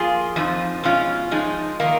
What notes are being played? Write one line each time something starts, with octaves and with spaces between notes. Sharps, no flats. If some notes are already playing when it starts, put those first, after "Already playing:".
Already playing: F3 A#3 F4 G#4
F2 F3 D#4
B2 G#3 C#4 F4
F3 G#3 D#4
D#3 A#3 D#4